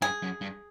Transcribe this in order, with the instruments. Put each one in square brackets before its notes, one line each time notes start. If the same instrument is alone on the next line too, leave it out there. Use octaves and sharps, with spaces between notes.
[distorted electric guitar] G2 [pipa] G#4
[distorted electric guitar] F#2
G2